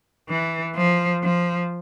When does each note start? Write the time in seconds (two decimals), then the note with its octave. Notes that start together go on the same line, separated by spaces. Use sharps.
0.29 E3
0.76 F3
1.23 F3